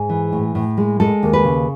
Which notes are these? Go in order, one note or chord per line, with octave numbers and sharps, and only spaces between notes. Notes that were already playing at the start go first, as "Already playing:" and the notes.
Already playing: G#2 G#4
E3
A2
A2
G#3
G#3 A4
D#2
B4
C#3